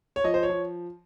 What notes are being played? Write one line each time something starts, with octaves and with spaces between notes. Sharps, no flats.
C#5
F3 D#5
C5
C#5
F3